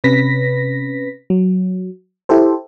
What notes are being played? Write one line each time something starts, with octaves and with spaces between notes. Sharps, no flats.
C3 C#4 B4 A#6 B6
F#3
E4 G4 A4 C5